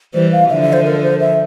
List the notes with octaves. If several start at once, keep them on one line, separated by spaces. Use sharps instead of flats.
E3 G3 C5
F5
D3 F3 E5
E5
C5
A#4
C5
E5